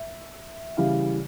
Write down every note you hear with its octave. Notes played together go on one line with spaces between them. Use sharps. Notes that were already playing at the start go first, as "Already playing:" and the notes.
Already playing: E5
C#3 E3 G3 F5